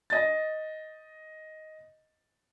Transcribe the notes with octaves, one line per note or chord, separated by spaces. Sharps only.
D#5 A6